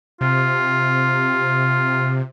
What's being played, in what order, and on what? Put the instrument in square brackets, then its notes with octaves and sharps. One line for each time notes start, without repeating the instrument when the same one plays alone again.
[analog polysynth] C3 [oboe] F4